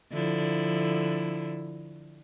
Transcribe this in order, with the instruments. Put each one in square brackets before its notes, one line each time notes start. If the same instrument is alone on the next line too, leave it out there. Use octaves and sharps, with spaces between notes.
[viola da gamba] D3 F3 E4